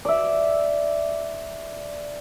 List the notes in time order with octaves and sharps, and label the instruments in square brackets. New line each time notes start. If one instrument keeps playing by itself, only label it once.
[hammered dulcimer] D5 E5